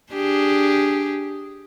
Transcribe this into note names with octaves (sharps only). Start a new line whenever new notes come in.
D4 G4 G#4